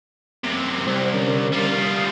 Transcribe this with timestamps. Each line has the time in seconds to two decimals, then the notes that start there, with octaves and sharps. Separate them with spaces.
0.44 F#2 C3
0.87 C2 C4 C5
1.14 D3 C#4 A#4
1.53 G3 F4
1.80 D#6